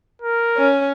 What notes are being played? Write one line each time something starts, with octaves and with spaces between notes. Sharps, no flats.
A#4
C#4